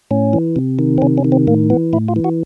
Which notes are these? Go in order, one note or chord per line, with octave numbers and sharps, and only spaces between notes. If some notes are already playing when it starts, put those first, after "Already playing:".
A2 C#4
E3
C3
D#3
C4
C3 C#4
C#4
D#3
C4
A2 A#3
E3 B3
A2 E4
F4
E3
F#4